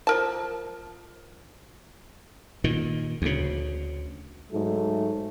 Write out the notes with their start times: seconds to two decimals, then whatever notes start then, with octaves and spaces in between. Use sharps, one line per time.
0.07 F3 A#4 A5
2.64 A#2 D#3
3.22 D2 C#3
4.52 G#2 F#3 A3